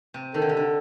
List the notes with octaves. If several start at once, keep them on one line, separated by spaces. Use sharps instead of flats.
C3
D#3 A4
D3
C3
D3